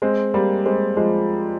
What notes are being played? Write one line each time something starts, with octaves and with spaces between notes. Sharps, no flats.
G#3 C4
G3 A#3
G#3 C4
F3 G#3